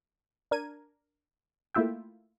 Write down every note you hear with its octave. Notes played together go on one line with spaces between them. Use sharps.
D4 A#4 G#6 D#7
A3 A#3 E4 F4 E5 G5